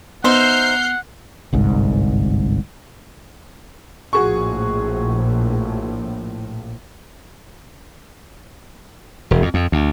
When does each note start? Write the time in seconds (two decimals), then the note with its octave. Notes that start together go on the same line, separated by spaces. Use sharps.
0.24 B3 D#4 C5 E5 F#5 F6 G6 C7
1.53 G1 C2 G#2
4.13 A#1 A2 F#4 G#4 C#6
9.31 E1
9.42 F2
9.54 F2
9.72 D2